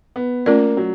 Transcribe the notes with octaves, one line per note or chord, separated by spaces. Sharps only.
B3
A3 A#3 C#4 F4 A#4 D5
F#3